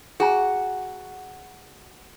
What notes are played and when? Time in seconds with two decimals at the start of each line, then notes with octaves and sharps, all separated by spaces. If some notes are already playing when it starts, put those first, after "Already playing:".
0.20 F#4 G#4 G#5 A#5